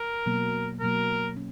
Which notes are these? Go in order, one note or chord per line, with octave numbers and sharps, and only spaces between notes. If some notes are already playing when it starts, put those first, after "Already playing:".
Already playing: A#4
B2 F#3 A#3
B2 F#3 A#3 A#4
C#4